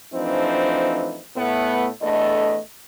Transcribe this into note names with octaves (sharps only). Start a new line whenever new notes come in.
E3 F3 A3 C4 D4 D#4
A2 A3 B3
E2 A3 D4 A4 D#5